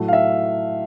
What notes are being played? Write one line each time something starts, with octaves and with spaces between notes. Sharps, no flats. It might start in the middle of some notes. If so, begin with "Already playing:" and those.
Already playing: A2 F#3 A3
F5
E5